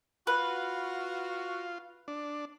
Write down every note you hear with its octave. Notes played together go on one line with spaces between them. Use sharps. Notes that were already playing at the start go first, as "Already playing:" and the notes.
F4 F#4 B4
D4